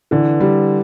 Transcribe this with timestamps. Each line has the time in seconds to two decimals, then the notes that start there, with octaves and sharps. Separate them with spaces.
0.11 D3 E3
0.40 G3